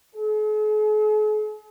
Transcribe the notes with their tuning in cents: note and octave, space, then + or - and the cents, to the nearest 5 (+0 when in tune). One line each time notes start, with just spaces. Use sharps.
G#4 +45